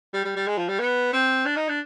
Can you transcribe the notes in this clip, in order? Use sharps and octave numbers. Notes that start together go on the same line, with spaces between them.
G3
G3
G3
G#3
F3
G3
B3
C4
D4
D#4
D4